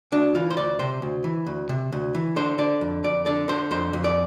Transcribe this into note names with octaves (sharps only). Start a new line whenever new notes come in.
D2 D4
E3 F4
C5
D2 D5
C3 C5
D2
E3
D2
C3
D2
E3
D3 C5
D3 D5
F2
F2 D5
D3 D5
D3 C5
F2 C5
F2
D5